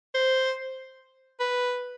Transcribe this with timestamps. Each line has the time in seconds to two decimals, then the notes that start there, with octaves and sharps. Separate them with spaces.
0.14 C5
1.40 B4